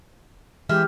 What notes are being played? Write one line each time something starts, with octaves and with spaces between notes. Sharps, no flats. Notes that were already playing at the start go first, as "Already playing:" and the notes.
E3 G#3 G4 E5 F6